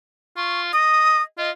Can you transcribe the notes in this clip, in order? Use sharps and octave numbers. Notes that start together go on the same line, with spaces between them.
F4 C#6
D#5 D#6
F4 D#5